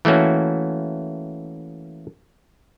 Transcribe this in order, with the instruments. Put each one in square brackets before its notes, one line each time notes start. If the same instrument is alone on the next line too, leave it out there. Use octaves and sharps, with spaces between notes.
[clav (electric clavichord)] E3 A3 A#3 C#4 F#4